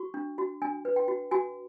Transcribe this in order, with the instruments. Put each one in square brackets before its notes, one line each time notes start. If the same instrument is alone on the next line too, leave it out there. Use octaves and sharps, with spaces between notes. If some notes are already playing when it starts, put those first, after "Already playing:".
Already playing: [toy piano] F#4 C#6
D4
F#4
D4 G#5
B4
G5
F#4
F#4 G#5